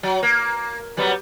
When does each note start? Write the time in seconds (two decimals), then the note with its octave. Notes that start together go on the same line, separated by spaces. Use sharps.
0.03 F#3
0.23 A#3
0.97 F#3 G3 B3